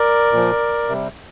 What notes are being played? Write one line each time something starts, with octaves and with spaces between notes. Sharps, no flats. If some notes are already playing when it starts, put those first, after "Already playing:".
Already playing: A#4 D5
A#2 F3
C3 G3